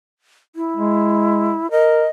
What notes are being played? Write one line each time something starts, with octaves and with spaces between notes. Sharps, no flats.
E4
G#3
A#4 D#5